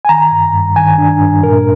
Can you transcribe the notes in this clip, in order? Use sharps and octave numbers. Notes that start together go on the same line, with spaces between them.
G#5
D#3 A#5
G2
G2
D#3 G#5
D4
G2
A#2 A#4